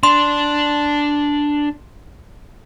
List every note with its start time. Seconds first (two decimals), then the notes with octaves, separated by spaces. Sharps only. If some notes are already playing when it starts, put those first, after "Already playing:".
0.03 D4 C6